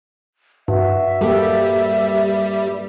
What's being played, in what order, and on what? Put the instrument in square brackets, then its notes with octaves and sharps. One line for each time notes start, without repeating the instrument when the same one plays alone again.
[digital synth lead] G2 [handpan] F#4 [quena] E5
[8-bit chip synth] G3 [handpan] A#3 G4 A4